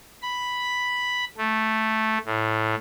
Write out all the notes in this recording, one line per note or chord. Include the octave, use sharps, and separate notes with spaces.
B5
A3
A2